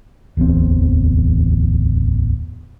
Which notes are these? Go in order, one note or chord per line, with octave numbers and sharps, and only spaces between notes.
D1 A1 E2 C4